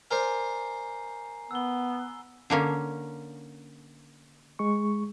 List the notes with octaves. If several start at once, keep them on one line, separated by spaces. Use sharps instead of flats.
A#4 C5 D5 G#5 A#5 C7
B3 E6 G7
D3 A#3 C#4
G#3 C#6